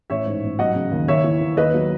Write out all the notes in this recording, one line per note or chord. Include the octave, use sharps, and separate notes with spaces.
A1 C#5 E5
G#2
A1
F#3 D#5 F#5
C#3
D#2
D#2 C#5 E5
E3
E3
D#2 B4 D#5
F#3